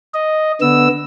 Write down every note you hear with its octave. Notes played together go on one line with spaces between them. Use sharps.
D#5
D3 B3 E6